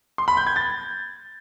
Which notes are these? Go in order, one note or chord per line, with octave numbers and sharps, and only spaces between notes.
C6
B5
G6
G#6
A6